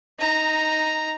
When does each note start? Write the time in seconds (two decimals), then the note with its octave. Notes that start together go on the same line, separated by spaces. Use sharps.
0.19 D#4 A#5